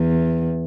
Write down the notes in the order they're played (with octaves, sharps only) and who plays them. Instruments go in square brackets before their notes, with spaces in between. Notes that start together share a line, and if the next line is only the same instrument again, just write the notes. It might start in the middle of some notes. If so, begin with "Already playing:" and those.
Already playing: [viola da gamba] E2